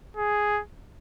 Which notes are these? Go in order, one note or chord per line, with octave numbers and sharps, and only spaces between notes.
G#4